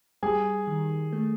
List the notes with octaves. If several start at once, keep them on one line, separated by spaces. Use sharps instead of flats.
G3 G#4 G#5
D#3
A3